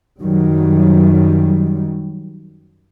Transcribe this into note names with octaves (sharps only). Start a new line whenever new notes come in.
F#2 D#3 F#3 G3